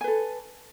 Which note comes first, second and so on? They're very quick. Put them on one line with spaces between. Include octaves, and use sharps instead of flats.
G#5 B4 A4